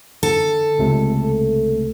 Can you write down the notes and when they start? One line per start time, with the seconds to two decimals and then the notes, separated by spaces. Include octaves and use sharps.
0.23 D3 A4
0.79 C#2 C3 A3